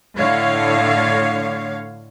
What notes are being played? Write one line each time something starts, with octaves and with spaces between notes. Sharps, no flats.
A2 D3 C#5 F5